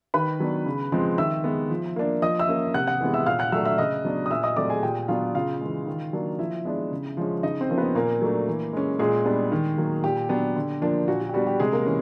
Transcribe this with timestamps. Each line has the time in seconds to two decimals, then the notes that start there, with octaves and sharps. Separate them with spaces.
0.14 D#3 B4 B5
0.40 F#3 B3 D4
0.66 C#3
0.92 F3 G#3 C4
1.18 D#3 E5 E6
1.44 G#3 B3
1.70 F3
1.96 A#3 D4
2.22 F3 D#5 D#6
2.39 E5 E6
2.48 A#3 C#4
2.74 C3 F#5 F#6
2.87 F#5 F#6
3.01 E3 G#3 B3
3.13 E5 E6
3.26 A#2 F5 F6
3.39 F#5 F#6
3.52 F#3 A3 D4 E5 E6
3.65 E5 E6
3.78 C#3 D#5 D#6
4.05 F#3 B3 D4
4.26 D#6
4.30 A#2 E5 E6
4.43 D#5 D#6
4.56 F#3 A3 C4 D5 D6
4.69 G#4 G#5
4.83 A#2 G4 G5
5.08 F#3 B3 D4 F4 F5
5.35 C#3 F4 F5
5.61 E3 G#3
5.87 D#3
6.13 F#3 A#3 D4
6.39 F3 E4 E5
6.65 G#3 B3 D4
6.91 C#3
7.17 F3 G#3 C#4
7.43 C#3 D#4 D#5
7.61 C4 C5
7.69 F3 A#3 C#4
7.78 B3 B4
7.95 A#2 A#3 A#4
8.22 F#3 A3 D4
8.47 E3
8.73 G#3 C#4
8.99 A#2 G#3 G#4
9.25 G3 B3 D4
9.52 D#3
9.78 F#3 A#3
10.04 A#2 G4
10.29 F#3 B3 D4
10.56 D3
10.82 F3 A#3 D4
11.08 A#2 F#4
11.21 F#4
11.29 G4
11.34 G3 B3 D4 F#4
11.47 G4
11.60 C3 G#3 G#4
11.73 A#3 A#4
11.86 E3 C#4